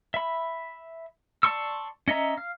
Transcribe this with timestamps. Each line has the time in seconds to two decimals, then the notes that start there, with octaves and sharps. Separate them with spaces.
0.14 E5 B5
1.43 D5 A5 C6 C#6 E6
2.08 C#4 D#5 E5 A#5
2.38 F5